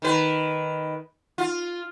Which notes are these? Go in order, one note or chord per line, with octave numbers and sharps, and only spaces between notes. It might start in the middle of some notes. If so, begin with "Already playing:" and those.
D#3 B4
F4